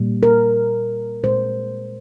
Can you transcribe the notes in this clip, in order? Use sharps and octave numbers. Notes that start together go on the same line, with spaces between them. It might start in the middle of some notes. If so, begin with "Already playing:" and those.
Already playing: A#2 G3 A#3
A#4
A#2 G#3 C5